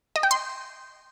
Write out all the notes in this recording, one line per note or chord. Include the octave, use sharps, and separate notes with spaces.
D#5
G5
C6